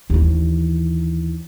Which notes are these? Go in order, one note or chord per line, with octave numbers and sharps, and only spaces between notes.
D#2 E3